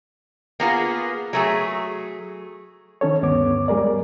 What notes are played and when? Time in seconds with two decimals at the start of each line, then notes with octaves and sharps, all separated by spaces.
0.60 A#3 B3 F4 G#4
1.33 F#3 A3 G#4
3.01 D#3 C#4 A4 C#5
3.22 D2 G2 B3 C#5 D6
3.68 G3 G#3 G#4 A#4 D5